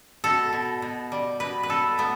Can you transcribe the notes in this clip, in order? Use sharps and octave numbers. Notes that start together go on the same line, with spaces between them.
B2 A4
B2
B2
G3
B2 B4
B4
B2 A4
A3 B3